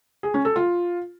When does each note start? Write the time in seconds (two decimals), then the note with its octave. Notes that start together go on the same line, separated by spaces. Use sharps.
0.23 G#4
0.34 C#4
0.45 A4
0.56 F4